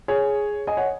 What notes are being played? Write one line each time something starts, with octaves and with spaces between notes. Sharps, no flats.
G#4 C#5
D#5 G#5
C#5 F#5